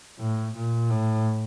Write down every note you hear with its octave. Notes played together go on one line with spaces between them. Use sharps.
A2
A#2
A2